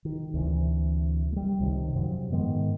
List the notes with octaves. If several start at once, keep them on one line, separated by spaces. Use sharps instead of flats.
D#3
D2 C3 E3
G3 A3
C#2 C3 D#3
F#2 C3 F3 F#3
G#2 D#3 G#3 B3